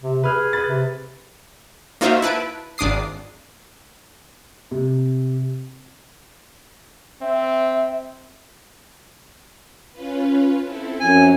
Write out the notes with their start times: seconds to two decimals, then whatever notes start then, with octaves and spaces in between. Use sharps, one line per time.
0.01 C3
0.24 G#4 B4 F6
0.53 B4 B5 A6
0.68 C3
2.01 A#3 D#4 F4 F#4 C5 E5
2.22 E4 B4 A5 D7
2.78 G#1 D4 D6 D#6 C7
4.71 C3
7.22 C4 E5
9.92 C#4 F4 B4
10.63 C4 E4 A4
11.00 F#2 F3 C4 C#4 G#5